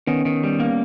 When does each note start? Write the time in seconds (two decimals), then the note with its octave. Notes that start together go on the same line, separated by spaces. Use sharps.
0.07 D#3 B3 C#4
0.25 D#3
0.43 G3
0.60 A#3